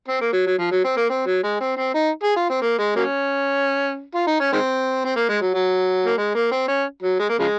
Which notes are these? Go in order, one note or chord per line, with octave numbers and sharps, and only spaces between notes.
C4
A#3
F#3
F#3
F3
F#3
C4
A#3
C4
F#3
G#3
C4
C4
D#4
G#4
F4
C4
A#3
G#3
F#3 A#3 C#4
F4
D#4
C#4
D#3 G#3 C4
C4
A#3
G#3
F#3
F#3
A#3
G#3
A#3
C4
C#4
F#3
G#3
A#3
C#3 F3 G#3